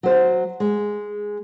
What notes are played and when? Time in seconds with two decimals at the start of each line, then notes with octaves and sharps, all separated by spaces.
0.03 F#3 C5
0.60 G#3